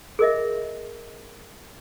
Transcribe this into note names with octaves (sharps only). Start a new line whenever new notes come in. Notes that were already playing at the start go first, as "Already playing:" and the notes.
G#4 A#4 D#5 E5